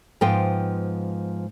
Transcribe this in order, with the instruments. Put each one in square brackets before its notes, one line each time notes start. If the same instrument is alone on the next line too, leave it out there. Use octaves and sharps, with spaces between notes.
[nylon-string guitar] G#2 F3 B3 C5 G5